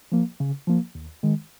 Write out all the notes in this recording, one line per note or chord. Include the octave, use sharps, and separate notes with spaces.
F3 A#3
C#3
F3 A#3
D#2
D#3 G#3